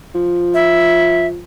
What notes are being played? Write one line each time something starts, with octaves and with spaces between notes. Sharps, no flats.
F3
E5